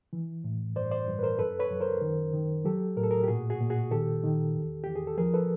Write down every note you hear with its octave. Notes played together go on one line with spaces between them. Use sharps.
E3
A2
G2 C5 D5
C5 D5
G2
B4
A#4 C5
F#2 A4 B4
B4 C#5
F#2
A#4 C5
D#3
D#3
F#3 G4 A4
A2 A#4
A4
G#4 A#4
G4
A#2 F#4 G#4
F#4 G#4
A#2
F#4 G#4
D#3 G4 A4
D#3
E2
E2 G4
G#4
A4
F3 G#4 A#4
A4 B4